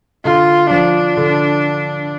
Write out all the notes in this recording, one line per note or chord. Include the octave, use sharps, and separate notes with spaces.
D3 F4
F3 D4
D3